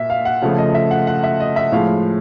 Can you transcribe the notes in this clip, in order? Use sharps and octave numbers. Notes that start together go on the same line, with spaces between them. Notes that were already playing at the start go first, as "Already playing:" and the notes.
Already playing: A#2 E5
F5
F#5
C#3 F3 A3 F5
D#5
E5
F#5
F#5
E5
D#5
E5
A2 F3 G#3 F5